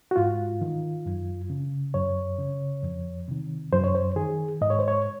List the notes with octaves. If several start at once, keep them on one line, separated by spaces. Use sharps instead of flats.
F#4
G#2 F4
D#3
F#2
C#3
F#2 C#5
C#3
F2
C3 D#3
F#2 C5
C#5
C5
D#3 G#4
G#2 D#5
C#5
C5
C#5